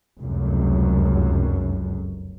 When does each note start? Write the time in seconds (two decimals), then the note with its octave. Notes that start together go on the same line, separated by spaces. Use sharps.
0.19 F1 C#2 F#2